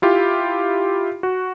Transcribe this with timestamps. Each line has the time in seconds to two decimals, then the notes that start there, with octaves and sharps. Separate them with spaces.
0.02 E4 F4 G4
1.23 F#4